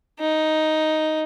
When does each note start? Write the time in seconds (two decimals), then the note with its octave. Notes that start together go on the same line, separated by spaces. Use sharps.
0.20 D#4